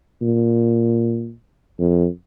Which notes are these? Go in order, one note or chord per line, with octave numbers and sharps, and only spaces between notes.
A#2
F2